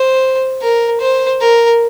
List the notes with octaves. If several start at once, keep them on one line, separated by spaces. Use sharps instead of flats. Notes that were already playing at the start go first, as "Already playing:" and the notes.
Already playing: C5
A#4
C5
A#4